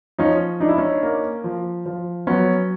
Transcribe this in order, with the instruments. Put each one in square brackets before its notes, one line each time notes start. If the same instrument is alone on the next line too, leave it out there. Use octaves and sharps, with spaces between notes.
[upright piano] F3 [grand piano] C#4 D#4
[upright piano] D4 [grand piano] D#4
[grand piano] E4
C#4 D#4
[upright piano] A#3
F3
F3
[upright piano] F#3 [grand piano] B3 C#4